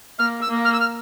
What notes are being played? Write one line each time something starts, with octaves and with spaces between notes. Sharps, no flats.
A#3 F6
E6
A#3
F6
E6
F6